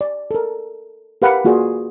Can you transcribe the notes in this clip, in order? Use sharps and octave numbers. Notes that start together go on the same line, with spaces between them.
D5
A4 A#4
G4 A#4 B4 F5 F#5 B5
A#3 F4 F#4 G#4 D5